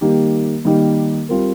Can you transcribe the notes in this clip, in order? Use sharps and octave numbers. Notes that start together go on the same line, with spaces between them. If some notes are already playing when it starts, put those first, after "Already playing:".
D#3 G3 A#3 D#4 G4
D#3 G3 A#3 D#4 G4
G3 C4 F4 A#4